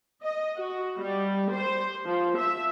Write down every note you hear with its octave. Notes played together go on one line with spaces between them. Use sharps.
D#5
F#4
G3
C5
F3
E5